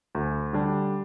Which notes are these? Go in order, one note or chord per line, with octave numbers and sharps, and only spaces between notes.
D2
D3 G3 D4